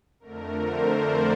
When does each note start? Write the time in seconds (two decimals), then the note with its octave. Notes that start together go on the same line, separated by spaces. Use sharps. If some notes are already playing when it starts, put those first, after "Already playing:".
0.20 F2 D3 A3 A#4
0.57 C5
0.95 D5